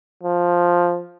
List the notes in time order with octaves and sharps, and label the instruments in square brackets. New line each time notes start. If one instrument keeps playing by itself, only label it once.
[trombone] F3